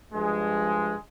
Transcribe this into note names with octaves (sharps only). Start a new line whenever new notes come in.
G2 F3 G#3